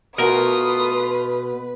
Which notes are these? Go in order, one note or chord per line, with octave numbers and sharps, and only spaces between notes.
B2 A3 F4 A#4 B4 D#6